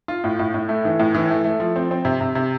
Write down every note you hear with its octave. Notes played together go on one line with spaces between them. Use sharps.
F4
A2
A2
A2
A3
E3
A2
E3
A3
A3
F3
C4
C4
C3
C3
C3